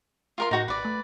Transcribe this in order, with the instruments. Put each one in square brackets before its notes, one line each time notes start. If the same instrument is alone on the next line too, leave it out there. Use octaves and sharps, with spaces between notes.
[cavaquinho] F4 A#4 C6
[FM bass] A2 [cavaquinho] D#4 F#4 F#5
[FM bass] G#1 [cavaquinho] B4 D5
[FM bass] A3